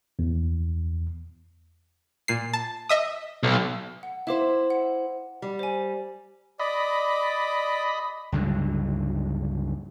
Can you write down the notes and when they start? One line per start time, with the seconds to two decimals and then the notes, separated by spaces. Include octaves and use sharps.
0.19 E2
2.28 A#2 C7
2.53 A5
2.89 D#5 E5 D#6
3.43 B1
4.03 F#5
4.27 E4 C5 E5 F5 D6
4.70 F#5
5.42 G3
5.59 C5 G#5
6.60 D5 D#5 B5
8.32 C#2 G2 D3 F#3